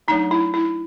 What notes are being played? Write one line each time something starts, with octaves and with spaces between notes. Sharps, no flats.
F#3 A3 D4 D#4
E4
E4